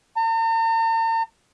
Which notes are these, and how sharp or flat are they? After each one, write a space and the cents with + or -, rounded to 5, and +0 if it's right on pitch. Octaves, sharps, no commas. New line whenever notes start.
A#5 -45